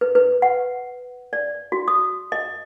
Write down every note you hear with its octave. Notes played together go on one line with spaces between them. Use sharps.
B4
B4
F#5
D5
F#4
D#6
D#5